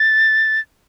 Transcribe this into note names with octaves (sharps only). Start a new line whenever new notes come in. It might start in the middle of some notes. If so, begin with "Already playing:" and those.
Already playing: A6